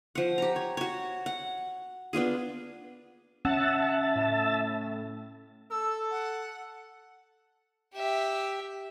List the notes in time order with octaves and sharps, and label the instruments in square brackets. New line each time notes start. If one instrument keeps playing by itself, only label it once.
[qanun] F3 F#5
G4 A#5
C#5
F#4 C#5
F#5
B3 D4 F4 G#4
[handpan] C#4 [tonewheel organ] E5 A5 [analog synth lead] F#5
[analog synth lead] A2
[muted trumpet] A4 [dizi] E6
[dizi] F#5
[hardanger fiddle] G4 E5